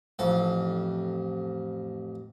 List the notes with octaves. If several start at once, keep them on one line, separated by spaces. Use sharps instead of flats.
A1 F2 A4